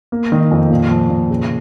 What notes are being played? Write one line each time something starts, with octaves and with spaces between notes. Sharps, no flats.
A#3
D#3
F2
A#2
F3
A#2
C#3